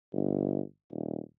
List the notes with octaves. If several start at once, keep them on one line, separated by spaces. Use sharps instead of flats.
G1
D#1